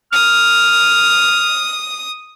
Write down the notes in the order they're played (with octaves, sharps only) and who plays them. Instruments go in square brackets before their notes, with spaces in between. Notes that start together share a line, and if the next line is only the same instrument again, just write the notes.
[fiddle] D#6 [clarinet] F6